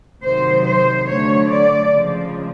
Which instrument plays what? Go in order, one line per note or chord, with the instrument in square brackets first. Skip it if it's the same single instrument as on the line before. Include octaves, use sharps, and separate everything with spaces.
[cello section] C3 D#3 F#3 C5
C5
D3 F#3 A3 C#5
D5
C#3 F3 G#3